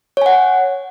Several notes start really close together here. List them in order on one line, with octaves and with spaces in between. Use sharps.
C#5 G#5 F#5